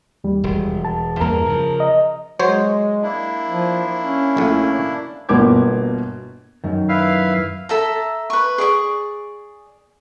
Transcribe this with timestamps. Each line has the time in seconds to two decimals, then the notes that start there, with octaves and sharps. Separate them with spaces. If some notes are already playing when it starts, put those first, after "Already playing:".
0.24 D#2 G3
0.44 E1
0.85 A5
1.21 E2 G2 A#3 A#4
1.46 C#3 F3
1.80 D#5
2.39 F#3 G#3 C5 C#5
3.03 A#3 D4 E4
3.50 F3
4.01 C#4
4.37 A#1 A2
5.29 G1 B2 A#3 D6 G#6
6.64 F#2 D#3
6.89 E4 B4 F5
7.69 A4 E5 A5 A#5
8.30 B4 C#6
8.58 G#4 D5 C#6